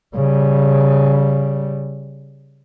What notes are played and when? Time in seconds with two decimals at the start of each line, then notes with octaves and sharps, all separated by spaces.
0.15 C#3 G3